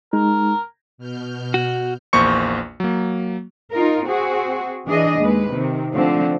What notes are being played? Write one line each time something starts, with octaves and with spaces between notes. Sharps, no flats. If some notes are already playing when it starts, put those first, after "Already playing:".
G#3 D#4 A#4
B2 F6 G6
F#4
A#1 E2 A#3 C5 C#6 C#7
F#3 A#3
D#4 F4 A#4
C4 F#4 G#4
E3 D4 G#4 D#5
D#2 G#3 B4
C3 D#3
D3 F3 A3 C4